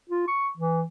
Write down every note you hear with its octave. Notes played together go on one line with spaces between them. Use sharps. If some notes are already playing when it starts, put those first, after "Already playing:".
F4
C#6
E3